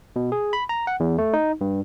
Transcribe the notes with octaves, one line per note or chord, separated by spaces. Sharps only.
B2
G#4
B5
A#5
F#5
E2
A3
D#4
G2